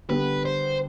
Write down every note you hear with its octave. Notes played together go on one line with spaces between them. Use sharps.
D3 G3 B3 B4
C5